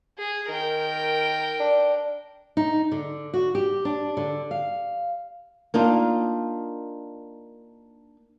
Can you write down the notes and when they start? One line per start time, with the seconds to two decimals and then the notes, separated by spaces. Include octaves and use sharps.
0.18 G#4
0.49 D#3 A#4 G5
1.59 D4
2.57 D#4
2.92 D3
3.34 F#4
3.55 G4
3.85 D4
4.17 D3
4.51 F5
5.74 A#3 D4 D#4 F4